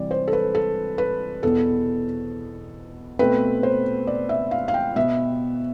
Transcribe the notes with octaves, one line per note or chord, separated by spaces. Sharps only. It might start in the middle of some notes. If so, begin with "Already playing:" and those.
Already playing: C3 E3 G3 D5
C5
A4
B4
A4
B4
E2 B2 B3 A4
B2 A3 C4 B4
C5
D5
E5
F5
F5
G5
B2 B3 E5